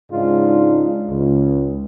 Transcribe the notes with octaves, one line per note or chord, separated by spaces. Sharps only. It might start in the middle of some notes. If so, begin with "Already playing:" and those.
G#2 C#3 G#3 D4 D#4 F4
C#2